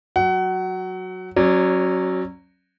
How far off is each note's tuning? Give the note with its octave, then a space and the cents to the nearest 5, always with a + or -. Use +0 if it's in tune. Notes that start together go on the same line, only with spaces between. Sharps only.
F#3 -5 F#5 +25
F#3 +0 C#4 -25 D5 +10